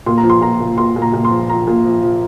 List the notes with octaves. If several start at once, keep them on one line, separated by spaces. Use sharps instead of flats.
A#2 C6
A#5
F3
C6
A#2 A#5
A#2
A#2 C6
A#2
A#5
A#2
C6
F3
F3 A#5
A#2
F3
F3